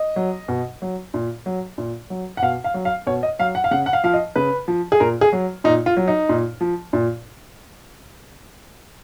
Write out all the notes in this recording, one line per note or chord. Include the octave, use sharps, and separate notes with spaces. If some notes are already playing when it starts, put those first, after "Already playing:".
Already playing: D#5
F#3
B2
F#3
A#2
F#3
A#2
F#3
F#5
B2 F5
F5
F#3
F5
B2 C#5
D#5
F#3 F5
F#5
F5
C#3 F#5
F#5
F5
F3 F5
D#5
C#3 B4
F3
G#4
A#2 A#4
G#4
F#3
A#2 D#4
F4
F#3
D#4
A#2
F3
A#2